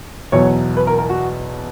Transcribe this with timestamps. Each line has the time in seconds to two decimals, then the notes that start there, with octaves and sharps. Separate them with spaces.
0.32 E2 B2 F#3 C#5
0.77 B4
0.87 A#4
0.98 A#4
1.10 F#4